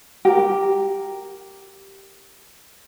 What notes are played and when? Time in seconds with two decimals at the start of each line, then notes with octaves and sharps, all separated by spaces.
0.25 G4 A#4